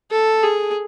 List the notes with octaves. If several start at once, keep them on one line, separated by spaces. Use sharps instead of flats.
A4
G#4